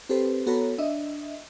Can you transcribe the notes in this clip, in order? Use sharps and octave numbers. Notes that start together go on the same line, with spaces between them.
C4 G4 A4 B4 C5
B3 F#4 A4 C#5 A#5 B5
D4 D#5 E5